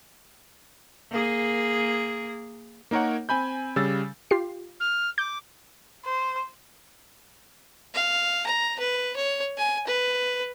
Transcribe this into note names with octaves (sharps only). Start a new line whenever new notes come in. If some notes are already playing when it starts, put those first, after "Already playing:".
A#3 G#4
A#3 D#4 A#4 C#5 F#5
C4 G#5 B5 G6
C#3 G3 E6 A6
F4 G4 C7
F6
D6 G6
C5
F5
A#5
B4
C#5
G#5
B4